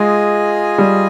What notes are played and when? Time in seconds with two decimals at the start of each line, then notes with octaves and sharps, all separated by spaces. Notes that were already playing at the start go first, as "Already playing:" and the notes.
Already playing: G#3 F4 G#4 D#5 G#5
0.78 G3